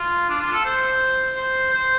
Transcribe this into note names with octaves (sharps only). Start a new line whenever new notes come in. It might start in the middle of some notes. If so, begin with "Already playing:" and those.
Already playing: F4
D4
F4
A4
C5
C5
C5